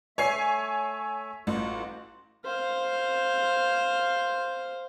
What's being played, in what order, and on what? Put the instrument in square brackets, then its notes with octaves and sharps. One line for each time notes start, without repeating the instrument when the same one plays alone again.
[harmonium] A3 E5 [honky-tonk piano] C#5 G#5 C7
[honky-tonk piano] A1 [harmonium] F4 F#4
[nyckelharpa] C5 F5